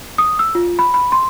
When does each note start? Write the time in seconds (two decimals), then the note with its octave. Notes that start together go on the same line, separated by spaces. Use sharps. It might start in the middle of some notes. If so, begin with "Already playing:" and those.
0.18 D#6
0.39 E6
0.55 F4
0.79 B5
0.94 B5
1.12 C6